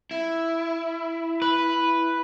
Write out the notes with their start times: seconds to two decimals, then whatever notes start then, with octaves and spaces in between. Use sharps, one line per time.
0.11 E4
1.42 B4